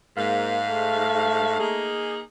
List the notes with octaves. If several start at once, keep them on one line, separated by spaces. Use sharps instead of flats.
G#2 A#3 F5
A3
A#3 D#4 G#4